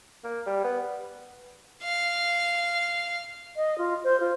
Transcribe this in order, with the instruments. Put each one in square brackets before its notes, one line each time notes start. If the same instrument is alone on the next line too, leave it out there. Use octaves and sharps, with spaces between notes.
[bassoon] A#3
G3
B3
[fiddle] F5
[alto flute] D#5
F4
C5
F4